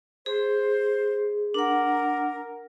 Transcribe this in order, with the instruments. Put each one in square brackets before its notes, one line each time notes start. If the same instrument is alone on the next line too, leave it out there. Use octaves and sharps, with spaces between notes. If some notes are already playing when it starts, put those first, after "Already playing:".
[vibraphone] G#4 [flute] C5
[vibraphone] D4 F#5 [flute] A#4